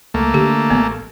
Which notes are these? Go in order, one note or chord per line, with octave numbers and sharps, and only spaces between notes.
C#2 A3 A#3
D3 G4
A1 B3